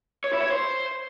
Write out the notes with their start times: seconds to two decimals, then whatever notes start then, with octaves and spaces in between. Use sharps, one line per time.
0.24 C#5
0.33 E4
0.42 C#5
0.51 C5